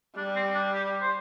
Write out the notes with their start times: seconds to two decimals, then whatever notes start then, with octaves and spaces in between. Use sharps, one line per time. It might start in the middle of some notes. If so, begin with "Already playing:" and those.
0.17 G3 D4
0.36 C4
0.54 D4
0.74 G4
1.02 C5